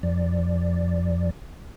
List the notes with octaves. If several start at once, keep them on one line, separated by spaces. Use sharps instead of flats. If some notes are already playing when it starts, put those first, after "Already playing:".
F2 F3 D5